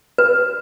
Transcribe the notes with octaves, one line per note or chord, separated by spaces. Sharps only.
B4